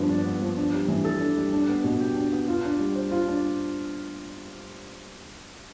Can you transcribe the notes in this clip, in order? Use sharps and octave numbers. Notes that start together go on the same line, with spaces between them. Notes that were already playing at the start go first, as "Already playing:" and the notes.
Already playing: G2 F3 B3
D4
B3
F3
D4
G3
E3
A4
D4
G3
D4
B3
B2
G4
D4
B3
F4
D4
G3
C5
F4
D4